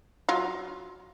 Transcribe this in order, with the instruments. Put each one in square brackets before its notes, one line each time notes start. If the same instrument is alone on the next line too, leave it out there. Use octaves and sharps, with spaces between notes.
[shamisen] F#3 F4